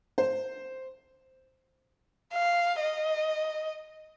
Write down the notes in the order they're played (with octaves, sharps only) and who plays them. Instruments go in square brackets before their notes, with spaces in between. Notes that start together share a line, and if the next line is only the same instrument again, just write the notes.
[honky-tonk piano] C5
[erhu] F5
D#5